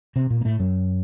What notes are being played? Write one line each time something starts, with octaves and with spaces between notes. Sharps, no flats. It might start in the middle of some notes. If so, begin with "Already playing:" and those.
C3 C4
A#2 A#3
A#3
A2 A3
F#2 F#3